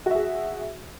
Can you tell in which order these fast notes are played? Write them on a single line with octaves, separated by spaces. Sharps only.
F#4 E5 G#4